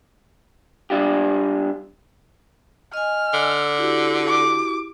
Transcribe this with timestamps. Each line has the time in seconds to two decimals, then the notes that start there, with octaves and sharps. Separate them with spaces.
0.90 G3 D4 F4 G4
2.94 D#5 G#5 F6
3.34 D3
3.78 E4 F#4 G4
4.27 D6